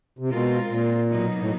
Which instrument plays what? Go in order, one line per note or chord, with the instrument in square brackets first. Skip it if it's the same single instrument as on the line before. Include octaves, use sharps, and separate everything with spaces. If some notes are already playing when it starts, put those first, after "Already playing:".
[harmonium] C3
[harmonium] B2 [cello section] G#3 C4 F4 A#4
[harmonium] A#2
[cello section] B2 F#3 A#3 D#4
[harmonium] A2